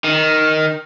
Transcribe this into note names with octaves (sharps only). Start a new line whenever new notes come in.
D#3